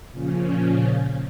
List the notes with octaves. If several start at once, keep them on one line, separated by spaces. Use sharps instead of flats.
A#2 C#3 F3 C#4